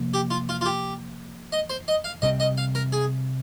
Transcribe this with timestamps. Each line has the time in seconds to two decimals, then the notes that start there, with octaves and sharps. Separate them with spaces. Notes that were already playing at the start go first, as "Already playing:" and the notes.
Already playing: C3 F3 A#3
0.14 G4
0.30 F4
0.49 F4
0.61 F4
0.65 G4
1.52 D#5
1.70 C5
1.88 D#5
2.04 F5
2.22 C3 G3 C4 D#5
2.40 D#5
2.58 F5
2.75 A#4
2.92 G#4